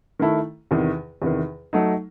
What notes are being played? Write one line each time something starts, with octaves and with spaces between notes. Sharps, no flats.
D#3 A3 E4 A4
E2 C3 D#3
E2 C3 D#3
F#3 A3 D#4 A4